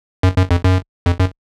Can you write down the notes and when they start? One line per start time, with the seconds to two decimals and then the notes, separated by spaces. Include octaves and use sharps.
0.23 F#2
0.37 F#2
0.51 F2
0.64 F#2
1.06 F2
1.20 F#2